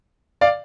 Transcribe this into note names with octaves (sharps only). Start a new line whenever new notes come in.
D5 F5